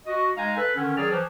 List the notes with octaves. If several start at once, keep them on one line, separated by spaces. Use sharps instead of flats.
F#4 D#5
G#3 D#4 F5 G#5 A#5
A4 B4
D3 D#3 C#4
D#3 F#3 G#4 D5 F6
E3 F3